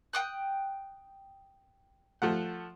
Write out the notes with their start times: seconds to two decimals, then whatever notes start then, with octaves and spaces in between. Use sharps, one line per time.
0.13 G5 D#6 F#6
2.22 F3 A3 F#5